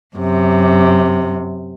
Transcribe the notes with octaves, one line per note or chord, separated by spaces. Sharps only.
F#2 C3